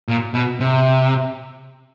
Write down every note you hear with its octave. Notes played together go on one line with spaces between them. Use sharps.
A#2
B2
C3